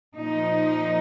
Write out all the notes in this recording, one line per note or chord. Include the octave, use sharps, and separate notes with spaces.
A#2 F3 D#4